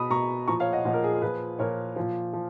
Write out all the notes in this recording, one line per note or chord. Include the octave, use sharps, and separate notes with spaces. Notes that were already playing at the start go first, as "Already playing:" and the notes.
Already playing: B2 B5 D#6
B2 A#5 C#6
A#2 F3 A#5 C#6
C#5 F5
D#5 F#5
A#2 F3 D#5 F#5
A#4
G#4
A#4
A#2 F3 G#4 B4
A#2 F3 A#4 C#5
A#2 F3
F3